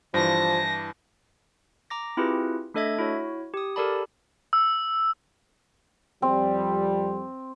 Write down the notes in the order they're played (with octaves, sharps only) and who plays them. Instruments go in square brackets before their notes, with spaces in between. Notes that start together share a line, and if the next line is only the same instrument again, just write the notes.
[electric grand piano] G2 E3 [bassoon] F3 [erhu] A5 [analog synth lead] A#6
[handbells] A#5 D6 A#6
C4 E4 F4 G4 G#4 B4
A3 D4 A4 D#5 E5 G#6
E4 F#4 C#5
G4 D#6
G4 A4 A#4 D5 A5 B5
[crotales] E6
[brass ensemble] F2 G3 [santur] C4